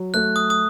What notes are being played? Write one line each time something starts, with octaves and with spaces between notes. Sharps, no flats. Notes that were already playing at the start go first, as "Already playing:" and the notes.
Already playing: F#3
A3 F#6
D#6
D#6